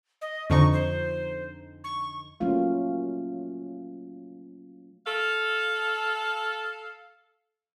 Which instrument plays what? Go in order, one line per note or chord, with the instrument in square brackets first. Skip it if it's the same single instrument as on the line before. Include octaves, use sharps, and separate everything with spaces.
[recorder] D#5
[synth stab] F2 D3 D#4 [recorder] C#6
[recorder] C5
C#6
[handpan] F#3 A3 A#3 C#4 F4 F5
[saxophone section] A4 F5